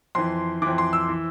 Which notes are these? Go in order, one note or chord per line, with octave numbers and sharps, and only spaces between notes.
F2 E3 C6
E3 D6
F2
C6
E6
E3